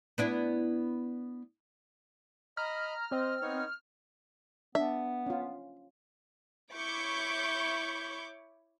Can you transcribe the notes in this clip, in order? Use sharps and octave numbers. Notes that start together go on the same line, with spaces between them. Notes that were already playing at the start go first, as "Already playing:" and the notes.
B3 D4 E4
D#5 A#5 B5 F6
C4 D#5
B3 D#4 C#5
B3 D4 E5
C#4 F4
E4 C#5 B5 C#6 D6 G6